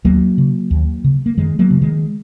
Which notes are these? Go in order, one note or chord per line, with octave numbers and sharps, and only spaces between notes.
D#2 F#3 A#3
C#3
D#2
C#3
A#3
F#2 D#3 G#3
F#3 A#3
C#3
D#3 G#3